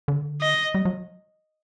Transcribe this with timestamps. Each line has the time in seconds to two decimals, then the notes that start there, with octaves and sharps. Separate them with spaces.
0.08 D3
0.41 D#5
0.74 G3
0.85 F#3